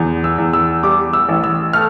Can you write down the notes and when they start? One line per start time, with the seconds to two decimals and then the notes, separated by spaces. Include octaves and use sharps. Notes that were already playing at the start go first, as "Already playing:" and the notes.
Already playing: E2
0.24 E6
0.38 E2
0.53 E6
0.83 G3 D6
1.13 E6
1.29 A1
1.44 E6
1.73 A3 F6